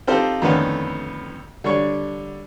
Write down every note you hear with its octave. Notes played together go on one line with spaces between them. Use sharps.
C4 D#4 F4 G4 A4 C5
F2 A2 D3 D#3 B3 C#4
D3 G3 D4 C#5 C#6